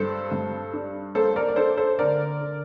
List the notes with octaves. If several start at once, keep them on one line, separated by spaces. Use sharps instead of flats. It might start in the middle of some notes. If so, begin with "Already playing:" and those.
Already playing: G2 A#3 A4 C5
G2
D4
A#3 A4 C5
A#4 D5
D5
D4 A4 C5
A4 C5
D3 A#4 D5
D3